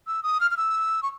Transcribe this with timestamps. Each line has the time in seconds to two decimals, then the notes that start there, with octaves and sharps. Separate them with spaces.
0.07 E6
0.23 D#6
0.41 F6
0.51 F6
0.57 E6
1.03 C#6